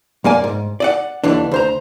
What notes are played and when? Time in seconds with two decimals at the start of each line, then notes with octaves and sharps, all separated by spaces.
0.24 F#2 A#3 D5 G#5
0.44 G#2
0.80 D5 D#5 F#5
1.24 D#2 D3 E3 D4
1.52 D2 C5 A#5